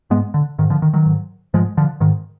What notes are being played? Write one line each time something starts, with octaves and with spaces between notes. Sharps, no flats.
G#2 G#3 B3
D3
G#2 D#3
D3 F3
D#3
D#3 F#3
G#2
G#2 F3 G#3
D3 F3
G#2 D#3